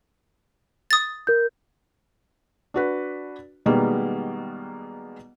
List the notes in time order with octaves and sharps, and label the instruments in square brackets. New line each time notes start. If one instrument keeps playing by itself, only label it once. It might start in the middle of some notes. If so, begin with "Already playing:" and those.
[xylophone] D#6 A6
[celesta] A#4 G6
[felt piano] D4 F#4 B4
B2 D#3 G3 G#3 A#3 B3